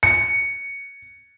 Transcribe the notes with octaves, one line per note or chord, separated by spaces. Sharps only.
C#7